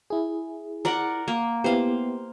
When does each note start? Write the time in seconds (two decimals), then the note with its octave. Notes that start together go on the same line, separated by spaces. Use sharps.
0.10 E4 G#4
0.85 A#4 D5 F#5
1.28 A#3
1.64 B3 E4 G4 C5 F5